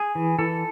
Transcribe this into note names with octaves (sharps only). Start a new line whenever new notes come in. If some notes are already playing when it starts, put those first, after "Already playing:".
Already playing: G#4
E3
E3 A4